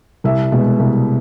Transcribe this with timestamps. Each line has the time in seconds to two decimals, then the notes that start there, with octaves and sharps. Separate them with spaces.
0.24 C2 E5
0.52 B2 G#3
0.79 C2